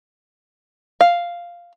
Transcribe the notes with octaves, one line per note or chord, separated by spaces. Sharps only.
F5